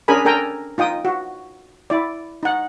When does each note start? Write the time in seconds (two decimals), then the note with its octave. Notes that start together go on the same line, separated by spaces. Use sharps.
0.08 C#4 D4 G#4 A#4 G#5 B5
0.25 D4 A4 A#4 G5 G#5 A#5
0.78 D#4 F4 G5 D#6
1.05 F#4
1.90 E4 D5
2.43 D#4 F#5